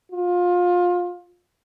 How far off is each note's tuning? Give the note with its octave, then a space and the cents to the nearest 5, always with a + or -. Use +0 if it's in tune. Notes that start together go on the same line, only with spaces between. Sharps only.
F4 +25